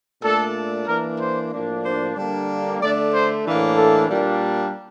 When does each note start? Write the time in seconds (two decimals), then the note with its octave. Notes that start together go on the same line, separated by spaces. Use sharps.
0.22 A#2 A3 D4 A4
0.87 E3 A#3 D4 A#4
1.19 C5
1.52 A2 F3 A#3 D4
1.84 C5
2.15 D3 G3 A#3 D4
2.80 D3 A3 D4 D5
3.12 C5
3.45 A2 E3 A#3 D4
3.77 A4
4.09 A#2 G3 A#3 D4